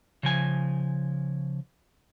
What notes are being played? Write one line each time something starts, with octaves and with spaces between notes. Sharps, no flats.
C#3 F3 G#5